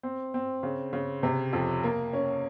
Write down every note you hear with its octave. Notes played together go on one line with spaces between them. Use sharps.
C4
C4
C#3
C#3
C3
F2
A#3
C#4